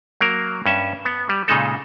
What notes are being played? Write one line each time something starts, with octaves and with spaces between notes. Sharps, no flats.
F#3 A#3 A#4
G2 C#4 E5
B3
G3
A#2 C#3 G#3 D#4 A4